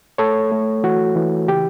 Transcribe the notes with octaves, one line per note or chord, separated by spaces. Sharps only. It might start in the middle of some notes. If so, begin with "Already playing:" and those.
A3 A4 C#5
A3
E3 F#4
E3
C#3 G4